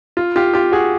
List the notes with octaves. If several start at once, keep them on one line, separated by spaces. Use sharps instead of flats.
F4
F4 G4
F4 G4
F#4 G#4